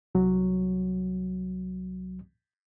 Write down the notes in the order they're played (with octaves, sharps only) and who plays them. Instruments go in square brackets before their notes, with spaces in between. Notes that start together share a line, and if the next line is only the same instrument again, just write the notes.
[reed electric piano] C2 F#3